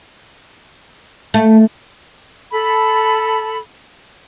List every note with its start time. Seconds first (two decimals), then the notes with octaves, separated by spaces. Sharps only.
1.34 A3
2.52 A4 B5